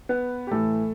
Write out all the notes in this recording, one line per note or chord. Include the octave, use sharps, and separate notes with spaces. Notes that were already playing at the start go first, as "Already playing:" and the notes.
B3 B4
G4
A2 E3 A3 A4